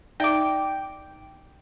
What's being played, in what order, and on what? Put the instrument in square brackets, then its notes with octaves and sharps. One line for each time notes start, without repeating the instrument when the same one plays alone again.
[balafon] D#4 D5 E5 [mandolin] G5 D6